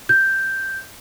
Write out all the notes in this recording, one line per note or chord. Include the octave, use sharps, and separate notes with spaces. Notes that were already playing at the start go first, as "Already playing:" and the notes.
G6